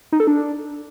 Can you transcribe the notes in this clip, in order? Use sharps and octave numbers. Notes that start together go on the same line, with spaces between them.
D#4
A4
D4